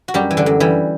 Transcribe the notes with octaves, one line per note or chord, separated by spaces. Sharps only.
F#4
F#2 G3 G4
E3
D3 D4
F#2
E3 G3